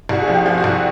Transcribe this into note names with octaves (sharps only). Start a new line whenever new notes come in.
C2 F#4
G#4
F3
G4
F3
F#4
C2